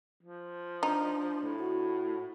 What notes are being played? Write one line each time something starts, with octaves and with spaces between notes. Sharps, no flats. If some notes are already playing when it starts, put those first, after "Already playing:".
F3
D4 D#4
A2
F#4